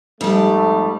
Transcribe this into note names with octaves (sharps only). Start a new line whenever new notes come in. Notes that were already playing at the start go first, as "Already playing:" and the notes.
F2 G#2 G3 A3